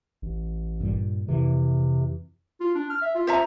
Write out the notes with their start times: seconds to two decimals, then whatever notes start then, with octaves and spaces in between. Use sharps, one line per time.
0.22 A1
0.80 G2 A#2 G3
1.28 F2 C3 E3
2.60 F4
2.75 D4
2.90 F6
3.02 E5
3.15 F4
3.27 C5 E5 A#5